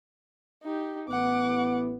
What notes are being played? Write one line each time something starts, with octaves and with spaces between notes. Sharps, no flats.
D#4 G4
A1 E3 B3 F#5 D6